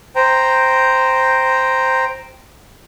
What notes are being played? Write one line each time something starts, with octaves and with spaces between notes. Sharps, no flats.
C5 G5 A#5